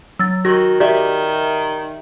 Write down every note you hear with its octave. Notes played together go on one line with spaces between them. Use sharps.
F#3 E6 A6
D#3 F#4 A#6
D#3 G4 D5 E5